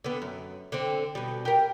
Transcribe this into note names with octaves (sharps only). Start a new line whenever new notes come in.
D3 B3
F#2
D3 C4
B2 G3
G4 A#4